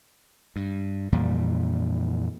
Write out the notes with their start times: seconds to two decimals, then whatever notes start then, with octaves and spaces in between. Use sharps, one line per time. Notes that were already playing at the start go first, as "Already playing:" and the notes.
0.56 G2
1.12 F2 A#2 E3 G3